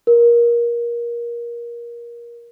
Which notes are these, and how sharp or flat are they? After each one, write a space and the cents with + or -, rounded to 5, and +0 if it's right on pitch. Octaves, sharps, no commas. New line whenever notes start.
A#4 +20